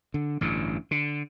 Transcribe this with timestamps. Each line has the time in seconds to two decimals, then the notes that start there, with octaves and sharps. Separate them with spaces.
0.14 D3
0.41 A1 G2 D3
0.91 D3